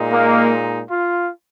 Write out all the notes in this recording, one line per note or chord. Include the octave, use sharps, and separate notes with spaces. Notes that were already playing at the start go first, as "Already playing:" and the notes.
Already playing: A#2 G#3 D#4
A#3
F4